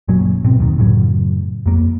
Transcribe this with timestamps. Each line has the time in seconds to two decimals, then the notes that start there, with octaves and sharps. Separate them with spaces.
0.08 F#1 A#2 F#3 C#4
0.44 G#2 B2 C4
0.59 F1 D2 A#2 D#3
0.78 F#2 A2 C#3 F#3
1.66 F2 A#3